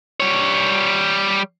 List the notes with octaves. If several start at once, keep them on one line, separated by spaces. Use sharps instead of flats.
G3 C#5